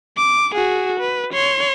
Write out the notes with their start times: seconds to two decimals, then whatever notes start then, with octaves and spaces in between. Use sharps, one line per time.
0.17 D6
0.55 F#4 G#4
1.00 B4
1.33 C#5 C6